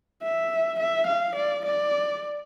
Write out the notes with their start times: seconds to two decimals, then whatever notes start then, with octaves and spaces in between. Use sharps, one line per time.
0.23 E5
0.80 E5
1.07 F5
1.36 D5
1.66 D5